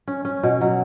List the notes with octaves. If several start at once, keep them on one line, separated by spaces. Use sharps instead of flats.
C#4
C#4
B2
F#3